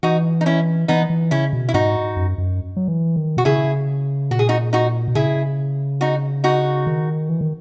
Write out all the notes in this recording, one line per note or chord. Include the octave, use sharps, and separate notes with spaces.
E3 D#4 F#4
D#4
C#4 E4
E3 B3 D#4
E3
C#3 C#4 E4
B2
E4
G#2 D#4 F#4
F#2
F#2
F#3
E3
D#3
B2 F#4
C#3 E4 G#4
A#2 F#4
G#4
D#4 F#4
D#4 F#4
B2
C#3 E4 G#4
D#4 F#4
D#4 F#4
D#3
E3
D#3